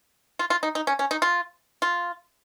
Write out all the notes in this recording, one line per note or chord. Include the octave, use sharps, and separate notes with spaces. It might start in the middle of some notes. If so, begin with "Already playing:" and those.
F4
F4
D#4
D#4
C#4
C#4
D#4
F4
F4